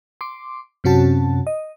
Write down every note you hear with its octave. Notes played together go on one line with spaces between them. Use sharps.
C6 D6
F#2 C3 C#4 F#4 A5
D#5